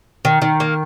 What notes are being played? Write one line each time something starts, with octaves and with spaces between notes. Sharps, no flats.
D#3
D#3
A#3